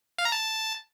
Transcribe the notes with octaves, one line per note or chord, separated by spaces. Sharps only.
F5
A#5
A5